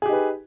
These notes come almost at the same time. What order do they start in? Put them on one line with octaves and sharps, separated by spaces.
G#4 G4 D#4 B4